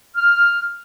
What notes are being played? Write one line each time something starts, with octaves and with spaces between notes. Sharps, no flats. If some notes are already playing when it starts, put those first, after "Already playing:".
F6